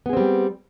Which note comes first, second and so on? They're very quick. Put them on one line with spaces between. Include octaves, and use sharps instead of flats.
B3 G#4 C4 G3